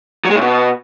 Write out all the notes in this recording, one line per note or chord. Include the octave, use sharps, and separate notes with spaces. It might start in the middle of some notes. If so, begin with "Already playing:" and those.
F#3
G#3
A2
B2